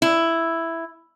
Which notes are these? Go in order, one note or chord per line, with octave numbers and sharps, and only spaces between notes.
E4